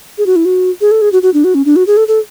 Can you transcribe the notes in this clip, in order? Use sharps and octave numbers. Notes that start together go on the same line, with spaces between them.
G#4
F#4
E4
F#4
G#4
A4
G#4
F#4
F#4
D4
F#4
C#4
D4
F#4
G#4
A4
A4